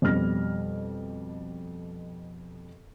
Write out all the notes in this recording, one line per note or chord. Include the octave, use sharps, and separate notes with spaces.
F2 B2 G3 F6 A#6